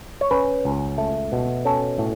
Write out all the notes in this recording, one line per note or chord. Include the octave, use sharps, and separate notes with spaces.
C#5
C#4 B4
C#2
A3
B2
C#4 A4
A2